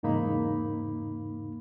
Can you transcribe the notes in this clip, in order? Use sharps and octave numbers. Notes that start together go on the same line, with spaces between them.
E2 G#2 C#3 A#3 D#4 B5